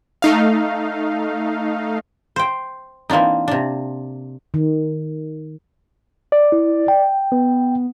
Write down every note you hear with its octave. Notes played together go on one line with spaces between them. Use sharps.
A3 D#4 F5
C5 G5
E3 A#3 C4 D4 D#4
C3 D4
D#3
D5
E4
G5
B3